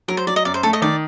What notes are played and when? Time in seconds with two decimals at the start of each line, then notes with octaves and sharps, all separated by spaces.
0.08 F#3 A#4
0.17 C5
0.27 F#3 D5
0.36 D#5
0.45 F#2 D5
0.54 C5
0.63 A3 A4
0.73 D#5
0.82 D#3 D5